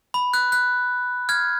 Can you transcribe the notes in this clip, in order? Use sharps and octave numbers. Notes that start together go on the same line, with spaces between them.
B5
F#6
F#6
F6 G#6